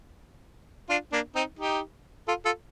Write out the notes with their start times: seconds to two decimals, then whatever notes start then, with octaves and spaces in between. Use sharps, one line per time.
0.89 D4 F4
1.12 A#3 D4
1.35 C4 D#4
1.59 D#4 G4
2.28 F4 A4
2.45 F4 A4